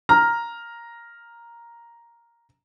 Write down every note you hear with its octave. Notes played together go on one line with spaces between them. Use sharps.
A#5 F6